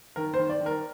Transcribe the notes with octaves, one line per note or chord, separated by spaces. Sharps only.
D#3 A#4
C5
D#3
D5
D#3
A#4